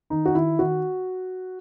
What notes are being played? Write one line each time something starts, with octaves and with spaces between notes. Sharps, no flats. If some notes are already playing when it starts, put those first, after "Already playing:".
D#3 D#4
F#4
D#3 E4
D#3 F#4